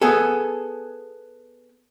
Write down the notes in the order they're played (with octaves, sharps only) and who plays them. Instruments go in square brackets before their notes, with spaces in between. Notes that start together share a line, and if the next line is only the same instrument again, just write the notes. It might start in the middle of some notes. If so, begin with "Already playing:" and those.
[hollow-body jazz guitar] B3 G#4 A4